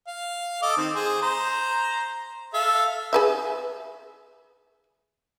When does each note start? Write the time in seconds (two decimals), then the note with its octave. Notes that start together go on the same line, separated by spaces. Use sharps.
0.07 F5
0.62 A4 D#5 D6
0.77 D#3 C4
0.95 G#4 C5
1.22 C5 A#5
2.54 A4 E5 F5
3.13 G#4 B4 E5